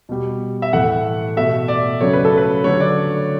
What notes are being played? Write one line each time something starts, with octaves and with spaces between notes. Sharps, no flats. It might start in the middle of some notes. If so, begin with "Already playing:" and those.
B2 G3
E5
A2 E3 A3 F#5
B2 A3 E5
D5
C#3 F#3 A3 C#5
B4
A4
B4
D3 F#3 A3 C#5
D5